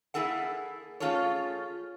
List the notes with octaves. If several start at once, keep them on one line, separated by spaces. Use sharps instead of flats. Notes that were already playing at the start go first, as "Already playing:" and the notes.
A#3 E4 G#4 A4 F#5
A3 C#4 F4 G#4 A4 C#5